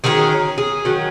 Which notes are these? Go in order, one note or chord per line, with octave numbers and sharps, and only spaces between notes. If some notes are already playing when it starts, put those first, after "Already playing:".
D#3 F#3 C#4 G#4
G#4
D#3 F#3 C#4